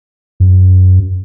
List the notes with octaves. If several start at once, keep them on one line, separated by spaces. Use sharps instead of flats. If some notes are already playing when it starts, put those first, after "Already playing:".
F#2